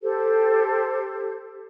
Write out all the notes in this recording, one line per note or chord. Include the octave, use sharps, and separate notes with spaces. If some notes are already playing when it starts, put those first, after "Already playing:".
G4 A4 C5